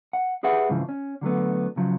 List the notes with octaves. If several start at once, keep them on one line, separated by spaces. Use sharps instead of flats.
F#5
G4 G#4 B4 E5 F#5
G#2 C#3 E3 F3
C#4
D3 F#3 A3 B3
C#3 F3 F#3